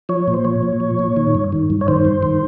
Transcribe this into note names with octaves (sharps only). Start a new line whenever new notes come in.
F3 C#5
A#2
C5
F3 C#5
A#2
F3
A#2
D#3
G2
D#3
G2
C#5
D#3 C5
G2
D#3